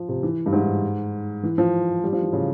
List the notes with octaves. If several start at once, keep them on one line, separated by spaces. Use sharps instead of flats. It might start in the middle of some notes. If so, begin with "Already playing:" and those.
Already playing: F3
C3
E3
G2
G#2
E3
F3
G3
F3
E3
C#3